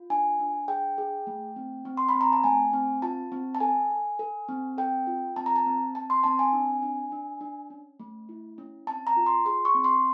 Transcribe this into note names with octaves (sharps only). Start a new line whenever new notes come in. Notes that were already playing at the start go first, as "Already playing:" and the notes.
Already playing: F4
D4 G#5
D4
G#4 G5
G#4
A3
C4
C4
C6
B5
C4
A#5
A5
A3 G#5
C4
F4 A5
C4
A5
A4 G#5
A4
A4
C4
A4 G5
F4
C4 A5
A#5
A5
C4
C4 A5
C6
C4 A5
G#5
D4
D4
D4
D4
C#4
A3
E4
C#4
C4 A5
A#5
F4
C6
G#4 C6
C#6
C4
C6